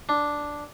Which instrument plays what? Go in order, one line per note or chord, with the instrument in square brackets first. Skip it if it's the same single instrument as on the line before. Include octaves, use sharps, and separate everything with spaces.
[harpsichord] D4